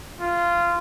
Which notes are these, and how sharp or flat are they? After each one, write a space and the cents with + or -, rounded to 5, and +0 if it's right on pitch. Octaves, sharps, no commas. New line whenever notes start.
F4 -15